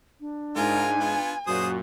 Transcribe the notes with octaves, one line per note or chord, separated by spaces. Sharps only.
D4
G#2 F4 A#4 G#5
B3 F4
F#2 A#2 F#4 G#4 C5 D#6